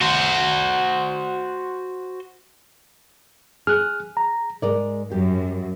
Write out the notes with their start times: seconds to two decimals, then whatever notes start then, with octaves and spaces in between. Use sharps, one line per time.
0.01 F#4 C5
3.67 G#4 F6 F#6
4.17 A#5
4.62 G#2 G#3 A#4 D5
5.11 F#2 G4